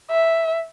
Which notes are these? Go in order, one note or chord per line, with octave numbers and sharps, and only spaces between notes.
E5